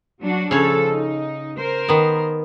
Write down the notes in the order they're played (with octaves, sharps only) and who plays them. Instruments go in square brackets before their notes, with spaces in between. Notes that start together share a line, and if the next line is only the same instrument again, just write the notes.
[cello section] F#3 D4 F#4
[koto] C#3 C#5 [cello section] F3 A4
[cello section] D#4
A#4 C5
[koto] D#3 B3